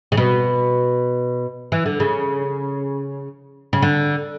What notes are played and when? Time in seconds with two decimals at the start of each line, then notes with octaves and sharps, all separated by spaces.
0.12 C#3
0.17 B2
1.72 E3
1.86 D3
2.00 C#3
3.73 C#3
3.82 D3